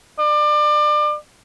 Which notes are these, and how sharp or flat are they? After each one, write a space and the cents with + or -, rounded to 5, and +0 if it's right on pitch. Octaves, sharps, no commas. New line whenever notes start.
D5 +30